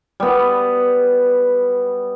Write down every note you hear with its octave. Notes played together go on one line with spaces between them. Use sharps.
G3 B3